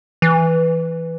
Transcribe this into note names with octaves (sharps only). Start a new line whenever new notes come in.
E3